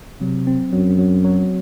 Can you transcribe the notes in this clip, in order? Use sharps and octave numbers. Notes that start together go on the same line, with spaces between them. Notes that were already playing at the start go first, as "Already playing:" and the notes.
C3 F#3
C4
F#2 F#3
F#3
F#3